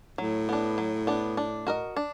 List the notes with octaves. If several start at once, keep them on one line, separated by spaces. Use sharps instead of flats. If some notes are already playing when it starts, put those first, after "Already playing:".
A2 F#3
B3 D4
F#3
B3 D4
D4
F#4 A#4 D#5
D4